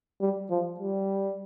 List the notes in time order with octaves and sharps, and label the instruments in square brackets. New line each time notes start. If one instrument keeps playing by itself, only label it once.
[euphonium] G3
F3
G3